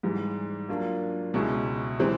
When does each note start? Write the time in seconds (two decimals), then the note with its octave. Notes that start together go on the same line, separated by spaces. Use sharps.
0.03 G#2 E3 G3
0.68 F#3 A#3 D4 F4
1.34 C#2 B2 G#3 C#4 E4
2.00 E3 G#3 C4